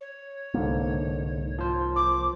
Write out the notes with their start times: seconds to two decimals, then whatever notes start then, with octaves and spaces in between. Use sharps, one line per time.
0.01 C#5
0.54 C2 G#2 D3 A#3
1.58 F3 C5
1.96 D6